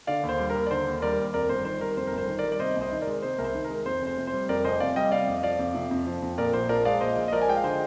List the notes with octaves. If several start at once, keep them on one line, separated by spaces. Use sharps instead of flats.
D3 D5 F5
D#2
C5
G3
D#2 A#4
D5
D3 C5
D#2
G3 A#4 D5
D#2
F2 A#4 D5
G1 C5
D#3 C5
G3 A#4
F2 C5
A#4
G1 C5
D#3
A#4 D5
G3
D5
C3 C5 D#5
C2
C5 D#5
D#3
A#4 D5
G#3
C3 C5
C2 A#4
C5
D#3
A#4
G#3
F2 C5
F1
C5
C3
C5
G3
F2 A#4 D5
F1 C5 D#5
C3 D5 F5
G3 D#5 G5
C3 D5 F5
F2
F3 D5 F5
F2
C3
F2
F3
F2
A#2 A#4 D5
A#1 C5
F3 A#4 D5
G#3 D5 F5
A#2 C5 D#5
A#1
D#5
F3 A#4 D5
G#5
G#3 G5
F5
D3 C5 D#5